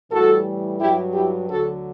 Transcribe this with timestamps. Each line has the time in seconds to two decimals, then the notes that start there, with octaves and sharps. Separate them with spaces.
0.10 A2 E3 G3 F#4 A4
0.79 G2 F#3 E4 G4
1.14 E4 G4
1.49 D2 D3 F#3 F#4 A4